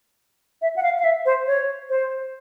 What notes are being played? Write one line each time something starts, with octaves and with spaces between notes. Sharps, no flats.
E5
F#5
F5
F5
E5
C5
C#5
C5